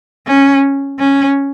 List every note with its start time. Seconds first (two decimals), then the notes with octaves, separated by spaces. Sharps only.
0.27 C#4
0.99 C#4